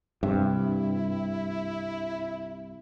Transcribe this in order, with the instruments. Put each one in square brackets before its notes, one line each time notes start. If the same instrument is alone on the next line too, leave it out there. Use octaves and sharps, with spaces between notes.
[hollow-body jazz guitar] C2 C3 E5 [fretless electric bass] G2 [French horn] E4